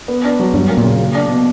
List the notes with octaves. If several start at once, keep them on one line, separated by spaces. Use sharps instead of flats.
B3
D4
F#3
G2 F#3
A#3
A#2
C#3
A#3
D4
B2